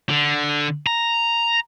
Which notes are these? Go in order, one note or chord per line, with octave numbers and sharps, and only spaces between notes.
D3
A#5